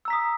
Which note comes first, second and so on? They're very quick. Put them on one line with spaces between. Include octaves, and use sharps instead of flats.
E6 A#5 B6 D#6